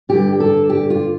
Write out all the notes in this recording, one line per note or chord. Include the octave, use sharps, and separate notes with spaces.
G2 D3 G4
A4
G4
F4